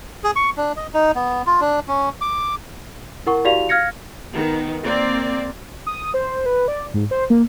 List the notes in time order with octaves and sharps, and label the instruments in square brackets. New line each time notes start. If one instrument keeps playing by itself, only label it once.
[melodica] G#4
C#6
D4
D#5
D#4
B3
F4
D4
C#4
D6
[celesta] E4 A#4 F#5 C#6
E4 F#4 G4 D5 F5 F7
F5 F6 G#6 A#6 C#7
[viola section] D#3 B3
A#3 C4 D5
[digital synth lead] D#6
C5
B4
D5
G#2
C5
A#3